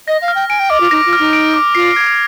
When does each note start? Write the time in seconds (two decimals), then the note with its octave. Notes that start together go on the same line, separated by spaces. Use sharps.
0.07 D#5 A#6
0.22 F5
0.28 F6
0.35 G5
0.49 G#5 D7
0.59 G5
0.70 D#5 D6
0.80 F4
0.91 D#4 A#6
1.06 F4
1.13 F6
1.19 D#4
1.33 D7
1.54 D6
1.75 F4 C7
1.96 G#6